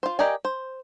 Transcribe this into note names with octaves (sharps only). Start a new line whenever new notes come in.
F4 C5
G4 A#4 D5 D#5 G#5
C5